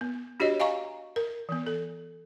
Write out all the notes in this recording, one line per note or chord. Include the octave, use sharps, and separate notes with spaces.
B3
D4 F#4 G4 C#5 D#5
D#5 F5 G#5 A#5 C#6
A#4
E3 B3
A4